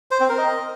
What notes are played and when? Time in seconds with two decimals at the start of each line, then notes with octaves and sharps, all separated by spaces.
0.11 C5
0.20 C4
0.29 A#4
0.38 D#5